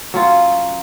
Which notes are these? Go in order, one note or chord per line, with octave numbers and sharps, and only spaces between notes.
F#3 C#4 F4